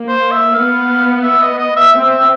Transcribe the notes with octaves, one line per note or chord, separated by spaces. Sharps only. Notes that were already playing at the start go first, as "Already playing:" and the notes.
Already playing: A#3
C5
E5
B3 F5
E5
D#5
D#5
E5
C4 E5
E5